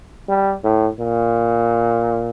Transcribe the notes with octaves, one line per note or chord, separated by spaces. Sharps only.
G3
A2
A#2